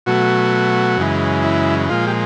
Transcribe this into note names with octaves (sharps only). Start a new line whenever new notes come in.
B2 F#3 A3 F#4
F#2 C#3 E3 G#3
E4
A#2 F3 G#3 F4
G4